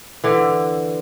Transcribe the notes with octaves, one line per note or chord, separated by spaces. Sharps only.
D3 E3